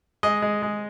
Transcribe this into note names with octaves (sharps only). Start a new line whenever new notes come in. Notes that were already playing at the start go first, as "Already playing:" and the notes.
G#3 D#5
G#3
G#3